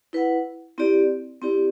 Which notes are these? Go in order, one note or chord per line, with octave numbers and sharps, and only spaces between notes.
E4 B4 F#5
C4 E4 G4 D5
C4 E4 G4 D5